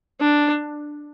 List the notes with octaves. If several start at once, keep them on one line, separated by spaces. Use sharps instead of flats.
D4